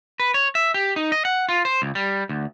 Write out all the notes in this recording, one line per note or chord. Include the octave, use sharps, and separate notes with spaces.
B4
C#5
E5
G4
D#4
D#5
F#5
F4
C5
C#2
G3
D2